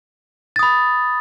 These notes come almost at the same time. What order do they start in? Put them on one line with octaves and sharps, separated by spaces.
A6 D#6 B5